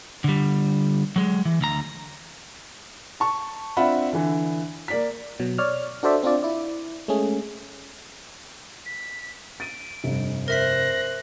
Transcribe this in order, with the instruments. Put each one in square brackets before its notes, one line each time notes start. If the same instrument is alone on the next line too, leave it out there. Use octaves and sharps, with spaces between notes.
[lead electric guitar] D3 G3
F#3 G#3
E3
D2 A#5
[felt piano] A5 C#6
C4 D4 F4 E5 F#5 B5
D3 E3
A#3 D5 B6
[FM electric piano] B2 F#3
C#5 D5 F6
D4 F#4 A4 C5 D5 E5
C4 D4 F4 D5
E4 D5
G#3 A3 C#4 G#4
[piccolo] B6
[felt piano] A6 D#7 [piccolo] D7
[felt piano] F1 G2
[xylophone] A#4 E5 B6 [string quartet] C5 F#6 [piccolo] A#6